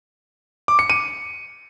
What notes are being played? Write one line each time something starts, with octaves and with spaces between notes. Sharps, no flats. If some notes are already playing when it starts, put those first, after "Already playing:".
D6
C#7
D#7